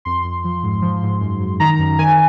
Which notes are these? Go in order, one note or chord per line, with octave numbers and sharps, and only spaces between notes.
F2 C6
F2
F3
G#2
F3
G#2
F#2
F#2
D#3 A#5
F#2
D#3 G#5